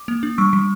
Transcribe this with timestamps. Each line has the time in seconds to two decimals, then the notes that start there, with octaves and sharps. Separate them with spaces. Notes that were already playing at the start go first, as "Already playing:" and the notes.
Already playing: D6
0.08 A#3
0.23 D4
0.38 G3 C#6 E6
0.53 G3